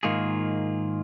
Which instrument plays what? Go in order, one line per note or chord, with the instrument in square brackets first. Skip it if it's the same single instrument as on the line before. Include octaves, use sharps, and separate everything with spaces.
[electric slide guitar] G#2 D#3 A#3 F4 G#4